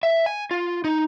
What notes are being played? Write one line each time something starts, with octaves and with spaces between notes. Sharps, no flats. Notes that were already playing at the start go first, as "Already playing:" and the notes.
E5
G#5
F4
D#4